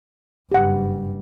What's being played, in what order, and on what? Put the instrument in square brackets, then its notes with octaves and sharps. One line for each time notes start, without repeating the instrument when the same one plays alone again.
[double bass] F#1 G2 [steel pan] G4 F#5